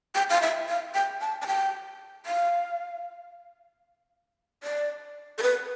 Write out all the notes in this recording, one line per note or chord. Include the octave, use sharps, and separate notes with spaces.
G5
F5
E5
F5
G5
A5
A5
G5
F5
D5
A4
B4